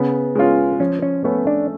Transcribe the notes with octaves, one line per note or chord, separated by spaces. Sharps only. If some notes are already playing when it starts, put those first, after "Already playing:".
Already playing: C#3 B3
G#3 C#4 F4
F3 C#4
C#4
A3 B3 C#4
D4